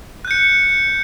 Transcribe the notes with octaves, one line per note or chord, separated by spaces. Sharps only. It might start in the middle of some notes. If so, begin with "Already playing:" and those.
F#6 G6 C#7